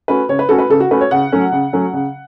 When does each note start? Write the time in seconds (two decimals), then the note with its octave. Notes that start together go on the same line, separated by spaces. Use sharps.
0.08 A3 C#4 F#4 B4
0.29 C#3 C#5
0.39 B4
0.49 A3 C#4 F#4 A4
0.59 B4
0.70 C#3 A4
0.80 F#4
0.91 A3 C#4 F#4 B4
1.01 C#5
1.11 C#3 F#5
1.32 F#3 A3 C#4
1.52 C#3
1.73 F#3 A3 C#4
1.93 C#3